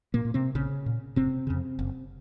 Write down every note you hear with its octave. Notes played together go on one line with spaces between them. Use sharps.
A#2 A#3
A#2
C3 C4
A#1 C#3 C#4
A#2
F#1 C3 C4
F2 C#3
F#1